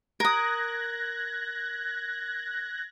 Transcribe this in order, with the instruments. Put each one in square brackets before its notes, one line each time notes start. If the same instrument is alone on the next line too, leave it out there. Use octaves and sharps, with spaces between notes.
[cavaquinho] A#4 D#6 [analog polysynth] F#6 G#6 A#6